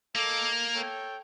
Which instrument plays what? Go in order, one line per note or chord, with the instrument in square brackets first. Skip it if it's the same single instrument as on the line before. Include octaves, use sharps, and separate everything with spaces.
[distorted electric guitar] A#3 [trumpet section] A4 D#5 D6
[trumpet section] A4 C#5 G5